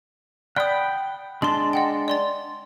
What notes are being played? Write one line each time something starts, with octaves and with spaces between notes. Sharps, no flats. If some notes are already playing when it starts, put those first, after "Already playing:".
D5 F#5 G5 B5 D#6
G#3 D4 A5 C6 F#7
D#5 F#5 G5
D5 C6 A6